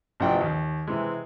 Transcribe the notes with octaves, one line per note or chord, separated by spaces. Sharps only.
A1 C3 E3 F3 F#5 G5
D#2
C3 E3 G#3